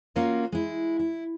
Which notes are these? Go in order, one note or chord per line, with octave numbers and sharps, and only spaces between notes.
A#3 C#4 F4 F#4 A#4
G#3 E4
E4